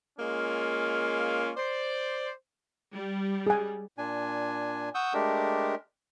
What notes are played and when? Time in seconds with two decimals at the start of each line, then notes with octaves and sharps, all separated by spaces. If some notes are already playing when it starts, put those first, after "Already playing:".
0.19 G#3 A#3 C#4 F4
1.57 C5 D5
2.93 G3
3.47 G#4 G#5
3.98 A#2 D4 G#5
4.95 F#5 C#6 D#6 E6 G6
5.14 G#3 A3 D4 G4 A#4